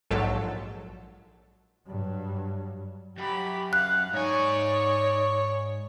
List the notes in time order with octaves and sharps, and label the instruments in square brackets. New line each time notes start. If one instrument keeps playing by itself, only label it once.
[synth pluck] A#1 G#2 F#3 A4
[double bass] G2 F#3
[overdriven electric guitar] F#2 [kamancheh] G4 B5
[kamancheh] F5 [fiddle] F#5 [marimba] F#6
[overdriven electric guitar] G#2 G#5 [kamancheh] D#4 D5 [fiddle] C#5 C#6